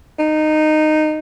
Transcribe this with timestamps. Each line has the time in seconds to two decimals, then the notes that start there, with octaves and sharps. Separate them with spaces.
0.19 D#4